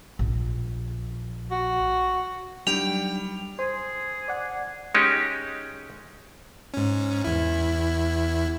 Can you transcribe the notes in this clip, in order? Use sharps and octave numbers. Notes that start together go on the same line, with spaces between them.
A#1
F#4
F#3 G3 D4 D#4 G5 F7
G#4 C5
D5 F#5
G#3 C#4 D#4 G4
G#2 C#4
E2 E4